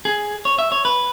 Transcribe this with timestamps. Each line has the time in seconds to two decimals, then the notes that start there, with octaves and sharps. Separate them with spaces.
0.05 G#4
0.45 C#5
0.58 E5
0.72 C#5
0.85 B4